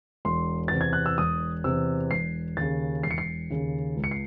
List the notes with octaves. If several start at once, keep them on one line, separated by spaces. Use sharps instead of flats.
E1 C6
E2 C3 A6
G#6
F#6
E6
E1 D#6
E2 C3 E6
E1 C7
D#2 C#3 A6
E1 C7
C#7
C7
D#2 C#3
C#2
C#7
C7